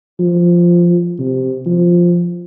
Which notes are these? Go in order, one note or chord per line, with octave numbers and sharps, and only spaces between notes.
F3
C3
F3